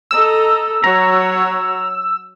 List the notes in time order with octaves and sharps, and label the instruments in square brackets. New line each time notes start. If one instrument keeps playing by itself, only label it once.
[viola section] A4 D#5 A#5 [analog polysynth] E6
[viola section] F#3 C#5 F#5 [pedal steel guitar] A#5